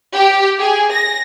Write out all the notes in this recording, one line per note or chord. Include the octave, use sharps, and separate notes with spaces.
G4
G#4
A#6